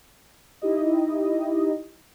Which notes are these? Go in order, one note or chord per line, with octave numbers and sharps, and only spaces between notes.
D#4 E4 G4 D#5